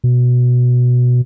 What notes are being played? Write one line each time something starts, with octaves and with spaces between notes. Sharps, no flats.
B2